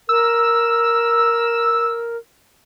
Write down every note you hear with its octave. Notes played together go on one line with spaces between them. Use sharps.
A#4 E6